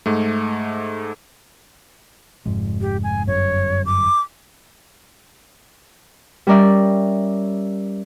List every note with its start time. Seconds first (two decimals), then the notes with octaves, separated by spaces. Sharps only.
0.06 G#2 A3
2.45 F1 G#2
2.81 G4
3.03 G#5
3.27 G1 F#2 C#5
3.85 D6
6.47 G3 C#4 A#4 D5 E5